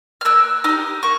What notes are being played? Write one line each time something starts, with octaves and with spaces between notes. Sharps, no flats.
F6
A#3 E6 F#6
D#4 G4 D#6 F6
A#3 C#6